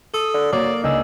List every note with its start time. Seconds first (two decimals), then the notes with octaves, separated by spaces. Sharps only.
0.14 A4 D#6
0.34 D3
0.52 F#3 A#3 D5
0.84 C#2 D4 D#4 G#5 E6